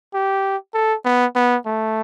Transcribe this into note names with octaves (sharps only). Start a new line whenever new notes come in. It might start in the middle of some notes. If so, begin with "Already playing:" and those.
G4
A4
B3
B3
A3